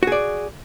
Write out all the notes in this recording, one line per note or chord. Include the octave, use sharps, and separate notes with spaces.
F#4 G#4 D5